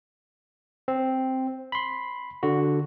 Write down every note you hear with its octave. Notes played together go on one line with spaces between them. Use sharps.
C4
B5 C6
D3 F#4